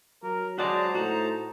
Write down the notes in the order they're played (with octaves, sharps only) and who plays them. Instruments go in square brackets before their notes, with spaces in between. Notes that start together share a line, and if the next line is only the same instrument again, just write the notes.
[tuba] F#3 [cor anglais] A#4
[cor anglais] G#3 [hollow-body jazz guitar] F#4 D5 [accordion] C5 A5 A#5
[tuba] A2 [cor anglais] D#4 [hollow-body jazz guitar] F#4